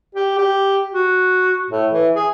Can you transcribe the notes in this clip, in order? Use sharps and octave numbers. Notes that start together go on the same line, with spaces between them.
G4
G4
F#4
A2
E3
G#4